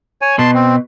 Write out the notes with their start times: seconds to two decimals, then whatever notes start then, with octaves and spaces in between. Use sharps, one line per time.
0.22 C#5 G#5
0.39 B2 A5 C6
0.54 C4